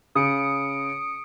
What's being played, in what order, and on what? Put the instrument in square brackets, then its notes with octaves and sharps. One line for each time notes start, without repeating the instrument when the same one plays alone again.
[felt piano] C#3 [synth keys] D#6 C#7 D7